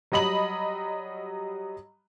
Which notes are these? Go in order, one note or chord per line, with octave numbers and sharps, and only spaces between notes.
F#3 G3 D#5 B5 F#7